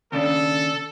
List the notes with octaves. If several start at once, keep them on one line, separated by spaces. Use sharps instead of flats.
D#2 C#3 D4 A4